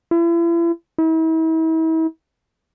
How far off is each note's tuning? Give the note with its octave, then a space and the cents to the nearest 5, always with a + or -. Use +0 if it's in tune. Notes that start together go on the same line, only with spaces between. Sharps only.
E4 +40
E4 -40